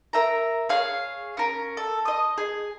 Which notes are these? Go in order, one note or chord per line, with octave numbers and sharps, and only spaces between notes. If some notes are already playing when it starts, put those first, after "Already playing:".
A#4 E5 A#5
G#4 C#5 F5
C#4 A#4
A4
D#5 D#6
G#4